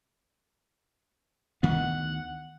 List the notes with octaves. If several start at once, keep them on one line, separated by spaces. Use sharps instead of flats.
D2 D#3 B3 F#5